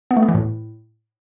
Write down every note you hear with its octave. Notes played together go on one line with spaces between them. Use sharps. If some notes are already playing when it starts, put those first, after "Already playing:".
B3
A3
B3
E3
A2